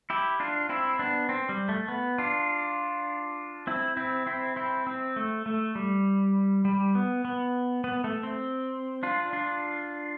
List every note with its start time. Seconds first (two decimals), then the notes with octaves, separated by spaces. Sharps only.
0.10 E4 G4
0.40 D4 F4
0.69 C4 E4
0.99 B3 D4
1.29 C4
1.49 G3
1.69 A3
1.88 B3
2.18 D4 F4
3.67 C4 E4
3.97 C4 E4
4.27 C4 E4
4.56 C4 E4
4.87 C4
5.16 A3
5.46 A3
5.75 G3
6.65 G3
6.95 B3
7.25 B3
7.84 B3
8.04 A3
8.23 C4
9.03 D4 F4
9.33 D4 F4